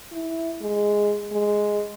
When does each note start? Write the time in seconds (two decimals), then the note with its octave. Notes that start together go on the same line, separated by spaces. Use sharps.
0.12 E4
0.62 G#3
1.33 G#3